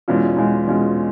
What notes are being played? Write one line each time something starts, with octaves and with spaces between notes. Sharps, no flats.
E2 B2 G#3 C#4 F4
E2 B2 G#3 C#4 F4
E2 B2 G#3 C#4 F4